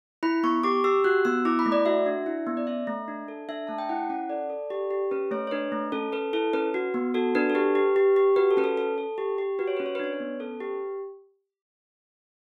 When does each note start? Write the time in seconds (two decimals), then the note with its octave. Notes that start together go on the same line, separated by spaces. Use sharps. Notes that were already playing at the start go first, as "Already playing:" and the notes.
0.23 E4 B5
0.43 B3 C#6
0.63 G4 D6
0.84 G4 E6
1.04 F#4 F#6
1.25 B3 E6
1.45 E4 D6
1.59 B5
1.66 A3
1.72 D5
1.86 F#4 E5
2.06 D4
2.26 E4
2.47 B3
2.57 D5
2.67 C#4 E5
2.87 A3
3.08 D4
3.28 A4
3.49 D4 E5
3.67 A3 A5
3.78 G5
3.89 E4 F#5
4.10 C#4 F#5
4.29 A4 D5
4.50 A4
4.70 G4
4.91 G4
5.11 C#4 B4
5.31 A3 C#5
5.47 C#5
5.51 D4 B4
5.72 A3
5.92 C#4 A4
6.12 A4 B4
6.33 E4 A4
6.53 C#4 B4
6.74 F#4
6.94 B3
7.14 F#4 A4
7.35 D4 B4
7.50 A4
7.55 G4 B4
7.75 G4
7.96 G4
8.16 G4
8.36 F#4 B4
8.51 A4
8.57 C#4 B4
8.64 A4
8.77 A4
8.98 A4
9.18 G4
9.38 G4
9.59 F#4 B4
9.67 C#5
9.77 C#4 B4
9.86 C#5
9.95 B4
9.99 D4 C#5
10.13 B4
10.20 B3
10.40 C#4 A4
10.60 G4 B4